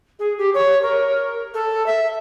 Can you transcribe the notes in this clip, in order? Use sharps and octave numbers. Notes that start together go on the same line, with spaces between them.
G#4
G4
C#5
A#4
A4
E5